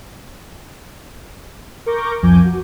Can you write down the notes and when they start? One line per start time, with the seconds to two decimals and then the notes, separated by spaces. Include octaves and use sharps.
1.86 A#4 C#6 D6 G6 A#6
2.22 C2 F2 F3 G#5 D6 G6
2.45 F#4